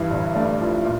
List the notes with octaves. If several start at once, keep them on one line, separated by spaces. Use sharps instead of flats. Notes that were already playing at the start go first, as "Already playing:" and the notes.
Already playing: G2 E3 E4
G1
A3 D4
F3
A#2